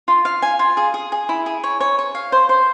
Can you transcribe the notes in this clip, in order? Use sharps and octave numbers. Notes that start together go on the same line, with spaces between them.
F4
F5
G#5
F4
G#4
G#4
G#4
E4
G#4
C#5
C#5
C#5
F5
C5
C5